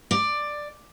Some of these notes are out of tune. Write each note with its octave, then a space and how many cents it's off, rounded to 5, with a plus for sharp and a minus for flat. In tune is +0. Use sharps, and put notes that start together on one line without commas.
D5 +10